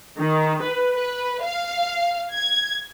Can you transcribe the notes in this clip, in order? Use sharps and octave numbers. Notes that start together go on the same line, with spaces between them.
D#3
B4
B4
F5
G#6